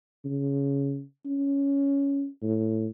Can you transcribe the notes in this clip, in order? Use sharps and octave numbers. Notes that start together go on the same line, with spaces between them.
C#3
C#4
A2